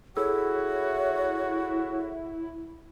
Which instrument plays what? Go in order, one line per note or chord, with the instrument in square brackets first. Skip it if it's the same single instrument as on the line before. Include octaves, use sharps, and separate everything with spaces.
[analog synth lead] E4 [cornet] F#4 [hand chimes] G#4 A4 E6 [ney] C#5